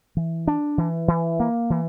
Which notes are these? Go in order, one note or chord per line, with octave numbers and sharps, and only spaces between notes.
E3
D4
E3
E3
A#3
E3